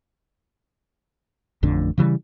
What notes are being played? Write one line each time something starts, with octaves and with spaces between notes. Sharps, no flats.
A1 F2 A2 D3
C#3 E3 F#3 G3